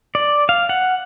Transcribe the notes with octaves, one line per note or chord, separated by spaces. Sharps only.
D5
F5
F#5